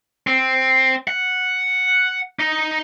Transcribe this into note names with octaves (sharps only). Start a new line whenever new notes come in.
C4
F#5
D#4